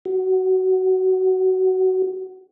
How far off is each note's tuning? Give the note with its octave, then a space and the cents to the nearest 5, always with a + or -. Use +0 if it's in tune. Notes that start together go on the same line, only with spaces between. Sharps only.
F#4 +20